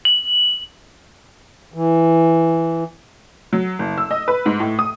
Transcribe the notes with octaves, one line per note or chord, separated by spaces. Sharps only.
F#7
E3
F#3
F#1
E6
D#5
B4
G#2
A2
D#6